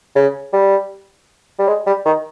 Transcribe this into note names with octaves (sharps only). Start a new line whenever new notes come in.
C#3
G3
G3
G#3
G3
D#3